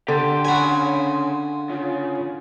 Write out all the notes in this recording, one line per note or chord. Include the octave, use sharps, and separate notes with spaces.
D3 G4 C6
C#3 F#4 G#5 B5
C#3 F4